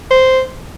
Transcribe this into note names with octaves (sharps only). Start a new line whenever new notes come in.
C5